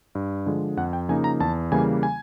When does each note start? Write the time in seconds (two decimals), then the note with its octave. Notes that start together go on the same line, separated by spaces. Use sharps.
0.15 G2
0.46 D3 F3 G#3
0.77 F2 F#5
0.93 G5
1.09 C#3 F3 A#3 D#4 G#5
1.24 A#5
1.40 E2 A5
1.72 C#3 E3 G3 A#3 G#5
2.03 G#5